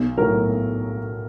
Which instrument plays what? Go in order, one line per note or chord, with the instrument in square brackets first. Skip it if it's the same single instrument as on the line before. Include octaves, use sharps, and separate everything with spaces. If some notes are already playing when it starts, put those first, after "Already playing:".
Already playing: [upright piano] B1
A2 F#3 A#4